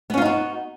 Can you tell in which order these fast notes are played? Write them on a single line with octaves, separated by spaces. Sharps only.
B3 C#4 F4 D#4 F#4